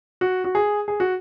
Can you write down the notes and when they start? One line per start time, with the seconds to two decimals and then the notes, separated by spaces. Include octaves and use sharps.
0.21 F#4
0.44 F#4
0.55 G#4
0.88 G#4
1.00 F#4